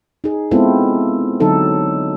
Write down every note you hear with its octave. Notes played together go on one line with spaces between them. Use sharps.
D#4 G#4
G#3 B3 C4 E4 F4 A4
D3 F#3 D#4 A4